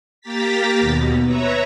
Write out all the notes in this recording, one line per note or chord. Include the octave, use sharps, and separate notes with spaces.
A#3 G4 A#5 A6 B6
D#2 B2
B4 C#5 E5 A#5